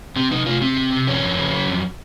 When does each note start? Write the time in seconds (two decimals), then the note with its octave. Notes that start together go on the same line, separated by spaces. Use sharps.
0.16 C3 C4
0.31 C3 D#4
0.46 C3 F4
0.61 C3 C4
0.77 C3
0.92 C3
1.07 F2 C#4
1.22 F2
1.37 C#3
1.52 F#3
1.68 F2